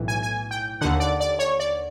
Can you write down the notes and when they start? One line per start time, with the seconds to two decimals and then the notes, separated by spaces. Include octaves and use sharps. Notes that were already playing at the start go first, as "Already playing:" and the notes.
Already playing: B1 A2 E3
0.08 G#5
0.23 G#5
0.51 G5
0.81 D#2 D3 F#5
1.00 D5
1.20 D5
1.39 C#5
1.60 D5